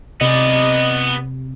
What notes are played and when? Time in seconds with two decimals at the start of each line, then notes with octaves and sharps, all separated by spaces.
0.21 C3 B3 D5 D#5